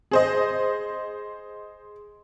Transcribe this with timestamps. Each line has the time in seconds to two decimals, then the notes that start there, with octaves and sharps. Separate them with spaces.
0.11 G#4 C5 D#5